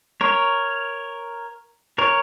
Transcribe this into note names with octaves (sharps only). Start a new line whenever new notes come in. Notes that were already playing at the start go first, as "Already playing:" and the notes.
A#4 C#5
A#4 C#5